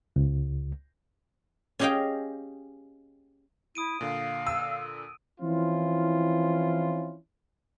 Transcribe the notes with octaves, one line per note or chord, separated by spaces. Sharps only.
C#2
C#4 G4 G#4 D#5 F5 G5
E4 D#6 D7 D#7
A#2 D3 F5
E6 D#7
E3 F3 C4 C#4 E4 F4